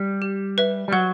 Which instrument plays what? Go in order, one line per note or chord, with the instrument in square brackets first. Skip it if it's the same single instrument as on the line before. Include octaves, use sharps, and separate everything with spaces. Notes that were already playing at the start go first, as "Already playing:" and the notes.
Already playing: [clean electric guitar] G3
[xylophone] G4
B4 E5
[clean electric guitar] G3
[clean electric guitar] F#3 [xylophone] F#5